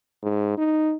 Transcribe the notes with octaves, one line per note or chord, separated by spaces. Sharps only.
G#2
D#4